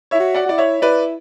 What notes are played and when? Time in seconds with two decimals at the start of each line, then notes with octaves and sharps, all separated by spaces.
0.11 E4 C#5 E5
0.20 F#4
0.35 D5 F#5
0.46 F#4
0.49 E4 D5
0.58 C#5 E5
0.82 E4 B4 D5